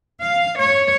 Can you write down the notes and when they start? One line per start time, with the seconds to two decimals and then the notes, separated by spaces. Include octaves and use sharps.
0.21 F5
0.57 C#5